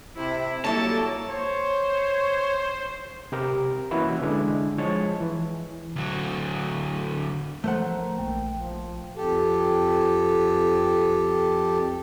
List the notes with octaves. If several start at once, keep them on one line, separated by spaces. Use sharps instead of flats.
C3 E4
F#3 G3 A#3 E4 A4 C#5 A5
C5 C#5
C3 G4 A#4
E3 A#3 C#4 E4 F#4 B4
D3 G#3 D4 E4
F3 G#3 C#5 A5
E3
D2 F#3
E3 F3 A3 A#4 C5 F#5
A#1 A#3 G5
F3
F2 G4 A4